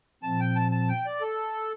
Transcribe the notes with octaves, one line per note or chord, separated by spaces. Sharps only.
A#2 F3 C4 A5
G5
A5
A5
G5
D5
A4